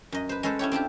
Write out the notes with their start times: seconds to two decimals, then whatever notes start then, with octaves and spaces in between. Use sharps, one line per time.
0.12 F#2 D#5
0.29 B4 C5
0.43 G#3 C#4 A4 B4 C5
0.59 C#4 E4 G4 C#5
0.72 C4 D4 F4 G4